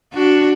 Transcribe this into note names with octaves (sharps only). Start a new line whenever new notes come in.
D4 F#4